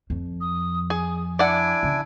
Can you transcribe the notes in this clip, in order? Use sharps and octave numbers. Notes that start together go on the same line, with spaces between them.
F2
D#6
G#4 D#6
D4 E4 D5 F#5 G#5 D7
C#3